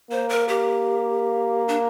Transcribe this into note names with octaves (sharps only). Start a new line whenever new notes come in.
A#3 C5
A#4
G4
D4